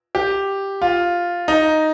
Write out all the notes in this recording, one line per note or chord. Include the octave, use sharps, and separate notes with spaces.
G4
F4
D#4